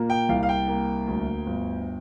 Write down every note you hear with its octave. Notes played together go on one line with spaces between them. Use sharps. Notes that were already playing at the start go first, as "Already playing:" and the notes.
Already playing: A#2 A#3
G5
C2 F5
F5
G5
A#3
D2
G1